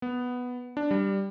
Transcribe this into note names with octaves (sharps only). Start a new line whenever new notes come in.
B3
D4
G3